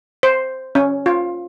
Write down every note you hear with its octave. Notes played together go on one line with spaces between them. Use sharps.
C5
C#4
F4